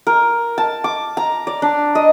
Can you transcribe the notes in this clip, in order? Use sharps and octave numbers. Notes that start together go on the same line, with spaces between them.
A#4
A5
D6
A#5
D5
D4
D#5